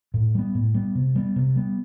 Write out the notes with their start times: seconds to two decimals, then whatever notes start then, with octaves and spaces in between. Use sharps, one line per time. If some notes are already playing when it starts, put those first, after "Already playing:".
0.14 A2
0.35 G3 B3
0.55 A2
0.74 G3 B3
0.95 C3
1.16 G3 B3
1.36 C3
1.56 G3 B3